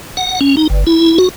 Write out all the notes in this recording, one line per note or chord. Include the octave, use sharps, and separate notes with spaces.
F#5
C#4
D#4
G1
E4
F#4